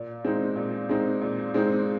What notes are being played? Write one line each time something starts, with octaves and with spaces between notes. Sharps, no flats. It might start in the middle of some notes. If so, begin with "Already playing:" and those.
Already playing: A#2
G#3 C4 D#4
A#2
G#3 C4 D#4
A#2
G#3 C4 D#4